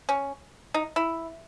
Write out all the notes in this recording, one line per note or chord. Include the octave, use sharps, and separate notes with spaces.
C#4
D#4
E4